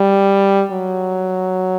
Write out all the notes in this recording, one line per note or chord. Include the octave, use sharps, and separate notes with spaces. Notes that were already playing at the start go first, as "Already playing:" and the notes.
Already playing: G3
F#3